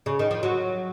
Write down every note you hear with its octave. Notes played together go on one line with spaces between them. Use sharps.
C#3
D#3
F3
F#3